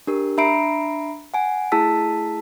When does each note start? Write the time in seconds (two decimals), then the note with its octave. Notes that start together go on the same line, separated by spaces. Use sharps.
0.07 D4 G4 A#4
0.38 D4 E5 A#5 B5 C7 D7
1.34 F#5 G#5
1.72 A3 E4 G#4 A5 E6 B6